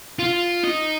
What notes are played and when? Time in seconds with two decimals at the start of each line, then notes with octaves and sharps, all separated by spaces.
0.19 F4
0.63 D#4